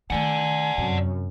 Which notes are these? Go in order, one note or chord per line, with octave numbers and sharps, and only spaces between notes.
D#3 A3 D5 F#5 G#5
F#2 C3